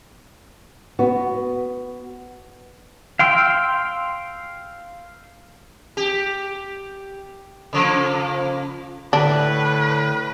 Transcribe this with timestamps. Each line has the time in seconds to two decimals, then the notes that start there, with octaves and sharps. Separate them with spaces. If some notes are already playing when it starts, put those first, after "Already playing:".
0.99 B3 F#4
3.19 F5 G5 C6 E6
5.97 G4
7.73 C#3 F3 A#3
9.13 A2 D3 D4 B4